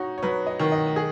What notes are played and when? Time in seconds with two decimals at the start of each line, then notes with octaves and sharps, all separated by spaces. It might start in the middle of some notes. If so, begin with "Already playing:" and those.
Already playing: D#4 F#4 C#5
0.18 C#5
0.23 F#3 B4
0.47 D#5
0.59 D#3
0.72 D#5
0.87 D#5
0.96 G#4